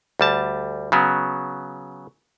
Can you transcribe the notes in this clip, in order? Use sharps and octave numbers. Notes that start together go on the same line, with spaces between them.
D2 G3 A5
C#3 F#3 B3